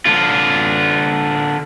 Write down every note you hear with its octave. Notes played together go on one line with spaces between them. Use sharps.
D3 F4